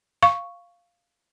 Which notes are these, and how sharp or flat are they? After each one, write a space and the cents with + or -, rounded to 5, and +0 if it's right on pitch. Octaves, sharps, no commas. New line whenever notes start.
F5 +0 C#6 +0